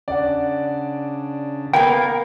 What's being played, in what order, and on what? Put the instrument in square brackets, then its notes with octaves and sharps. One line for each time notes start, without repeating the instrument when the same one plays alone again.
[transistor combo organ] C#3 D4 [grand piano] D5 F#5
[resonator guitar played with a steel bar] A#3 B3 [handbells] G5